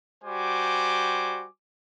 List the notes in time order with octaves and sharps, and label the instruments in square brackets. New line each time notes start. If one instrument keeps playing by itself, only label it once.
[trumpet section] G3 F#4 C5 G#5 D6